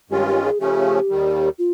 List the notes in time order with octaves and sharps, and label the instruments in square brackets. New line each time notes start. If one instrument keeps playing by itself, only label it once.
[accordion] G2 D#3 G#3 C#4 F4 [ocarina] G4
[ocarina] G4
G#4
[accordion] C#3 F3 A3 C#4 [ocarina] G4
[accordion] D#2 D#3 G3
[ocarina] F4